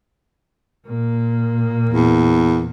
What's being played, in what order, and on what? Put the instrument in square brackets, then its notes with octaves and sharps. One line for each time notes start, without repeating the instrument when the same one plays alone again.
[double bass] A#2 A#3
[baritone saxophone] E2